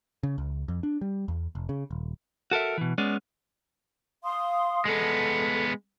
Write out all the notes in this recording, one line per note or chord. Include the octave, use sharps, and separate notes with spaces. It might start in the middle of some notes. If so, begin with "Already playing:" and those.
C#3
C#2
F2
D4
G3
E2
F1
C#3
D#1
F#4 A4 A#4 E5
B2 E3
G#3 B3 C#4 D5
F5 C6 D#6
G#3 B3 A4